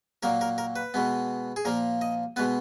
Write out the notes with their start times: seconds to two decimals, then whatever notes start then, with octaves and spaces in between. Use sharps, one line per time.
0.23 A#2 F#3 A#3 A#4
0.41 A#4
0.58 A#4
0.76 B4
0.94 B2 G#3 B3
1.56 G#4
1.65 A#2 F3 A#3 A#4
2.01 D#5
2.36 B2 G#3 B3 B4